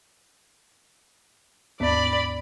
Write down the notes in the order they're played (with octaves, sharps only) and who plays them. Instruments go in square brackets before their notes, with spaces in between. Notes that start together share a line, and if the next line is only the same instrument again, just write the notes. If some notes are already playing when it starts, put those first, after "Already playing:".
[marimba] D#2 G#2 B3 [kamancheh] D5 B5